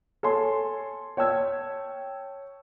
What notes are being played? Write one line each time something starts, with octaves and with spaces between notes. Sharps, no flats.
A4 C#5 G#5 C6
C#5 G5 A5 E6 G#6